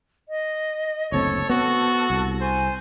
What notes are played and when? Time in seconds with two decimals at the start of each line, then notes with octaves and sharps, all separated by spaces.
0.29 D#5
1.12 F#1 D2 C4 A4 C#5
1.50 B3 C4 F#4
2.10 C2
2.41 C5 G#5